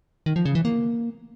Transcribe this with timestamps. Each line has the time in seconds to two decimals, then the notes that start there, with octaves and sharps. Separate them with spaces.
0.26 D#3
0.36 F3
0.45 C#3
0.55 E3
0.65 A#3